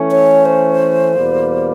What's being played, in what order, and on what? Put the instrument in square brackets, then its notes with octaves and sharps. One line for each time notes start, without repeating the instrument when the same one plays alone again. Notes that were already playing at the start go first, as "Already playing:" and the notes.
Already playing: [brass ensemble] E3 A3 C#4
[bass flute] C#5
C5
[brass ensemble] E2 B2 G3 A#3